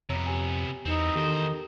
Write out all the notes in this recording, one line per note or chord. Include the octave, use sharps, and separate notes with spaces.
F2 C3 B3 C#5 A#5 E6
G4 G#5
E2 B3 C4 D#4
E2 D#3 G4 A4 A#4 C5